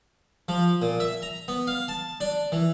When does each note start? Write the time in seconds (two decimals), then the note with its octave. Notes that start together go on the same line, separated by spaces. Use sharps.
0.49 F3
0.82 A#2
1.00 E5
1.22 A#5
1.48 B3
1.67 F5
1.88 A5
2.21 D4
2.52 E3